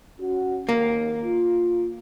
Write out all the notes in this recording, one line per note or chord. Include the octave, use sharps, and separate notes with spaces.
C#4 F#4
D#2 A#3
F4